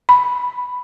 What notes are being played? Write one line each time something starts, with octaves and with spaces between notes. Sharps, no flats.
B5